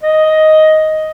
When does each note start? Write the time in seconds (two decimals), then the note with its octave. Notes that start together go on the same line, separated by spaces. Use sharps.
0.03 D#5